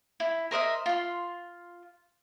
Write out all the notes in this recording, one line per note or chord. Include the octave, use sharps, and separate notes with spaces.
E4
A#4 C5 D#5 E5
F4 C6